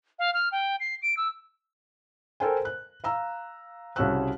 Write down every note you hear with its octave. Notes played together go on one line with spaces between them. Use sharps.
F5
F6
G5
C7
D7
E6
A4 A#4 C5 G5 G#5
F#6
F5 A#5 E6
C2 C#3 F#4 C#5 E6 F#6